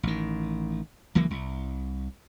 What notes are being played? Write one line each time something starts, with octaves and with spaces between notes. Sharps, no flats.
A1 D#3
C#2 E3 F#3 A#3
C2